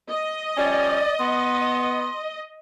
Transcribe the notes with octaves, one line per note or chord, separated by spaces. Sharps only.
D#5
F3 G3 C#4 D5
B3 C6